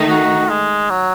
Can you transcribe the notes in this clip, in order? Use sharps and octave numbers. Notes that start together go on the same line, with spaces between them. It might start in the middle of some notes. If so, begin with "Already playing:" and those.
Already playing: D#3 A3 D#4
F#4
G#3
F#3